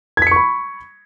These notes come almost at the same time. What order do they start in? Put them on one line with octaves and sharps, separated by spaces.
G#6 B6 C#7 C#6 B5